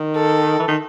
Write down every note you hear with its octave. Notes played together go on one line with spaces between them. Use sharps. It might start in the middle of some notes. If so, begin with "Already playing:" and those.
Already playing: D#3
A4
E3
D#3